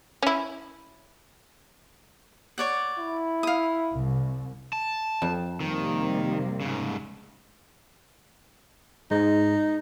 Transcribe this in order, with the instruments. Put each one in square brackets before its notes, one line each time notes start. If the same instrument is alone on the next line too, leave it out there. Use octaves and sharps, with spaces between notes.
[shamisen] C#4 E4
[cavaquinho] C#5 D5 F#5
[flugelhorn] E4
[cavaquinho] F5 D#6
[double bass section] C2
[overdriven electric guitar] A5
[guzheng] F2
[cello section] C3 G3 A#3 [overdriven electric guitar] D#3
[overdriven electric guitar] G#2 C#3
[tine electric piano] G#2 G#3 [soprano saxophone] D#4